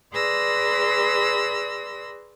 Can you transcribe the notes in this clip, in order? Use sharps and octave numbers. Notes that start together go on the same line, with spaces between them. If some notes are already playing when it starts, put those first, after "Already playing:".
G#4 B4 D5 C6 E6 A#6